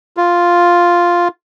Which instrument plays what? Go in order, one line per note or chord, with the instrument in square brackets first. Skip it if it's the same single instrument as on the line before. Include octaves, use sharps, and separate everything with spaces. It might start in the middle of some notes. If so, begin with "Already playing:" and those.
[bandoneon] F4